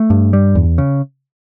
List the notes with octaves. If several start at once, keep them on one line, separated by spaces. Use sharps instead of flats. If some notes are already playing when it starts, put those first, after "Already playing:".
Already playing: A3
G2
G3
E2
C#3